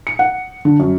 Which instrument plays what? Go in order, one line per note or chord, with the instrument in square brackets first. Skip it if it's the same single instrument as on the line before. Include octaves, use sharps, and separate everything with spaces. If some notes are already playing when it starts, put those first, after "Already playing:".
[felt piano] C#7
F#5
D3
F#2